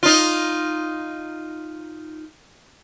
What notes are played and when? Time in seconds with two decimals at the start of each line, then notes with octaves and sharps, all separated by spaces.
0.03 D#4 F4